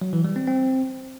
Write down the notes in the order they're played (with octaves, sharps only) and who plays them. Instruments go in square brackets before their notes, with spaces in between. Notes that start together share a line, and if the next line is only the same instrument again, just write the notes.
[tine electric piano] F#3
E3
G3
C4
C4